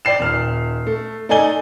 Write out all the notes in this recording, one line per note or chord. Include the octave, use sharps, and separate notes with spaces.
D5 G5 C7 E7
D#1 F6
A3
A3 D#4 D5 G#5 G7